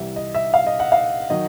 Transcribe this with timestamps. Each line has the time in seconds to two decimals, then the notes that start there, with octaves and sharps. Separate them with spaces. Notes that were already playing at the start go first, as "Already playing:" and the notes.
Already playing: C2 C3 E3 G3 E5
0.16 D#5
0.35 E5
0.54 F5
0.67 D#5
0.80 F#5
0.92 F5
1.30 D#3 F#3 D#5